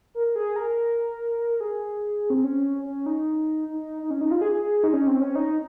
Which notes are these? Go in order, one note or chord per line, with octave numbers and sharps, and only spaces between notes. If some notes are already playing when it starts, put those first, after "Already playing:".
A#4
A#4
G#4
A#4
G#4
C4
C#4
C#4
D#4
D#4
D#4
C#4
D#4
F4
G#4
G#4
D#4
C#4
C4
C#4
D#4